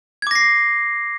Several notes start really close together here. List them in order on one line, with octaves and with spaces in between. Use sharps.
G#6 D6 A#6 C7